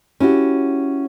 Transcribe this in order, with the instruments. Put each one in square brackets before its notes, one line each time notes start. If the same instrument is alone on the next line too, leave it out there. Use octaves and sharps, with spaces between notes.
[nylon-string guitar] C#4 E4 F#4 G4